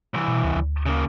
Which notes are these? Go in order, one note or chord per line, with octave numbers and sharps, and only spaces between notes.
C2 E3
B2
D2
D2
C#3 A#3